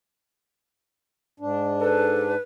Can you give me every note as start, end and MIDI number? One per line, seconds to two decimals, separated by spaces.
1.40 2.35 44
1.40 2.35 62
1.81 2.24 69
1.81 2.40 71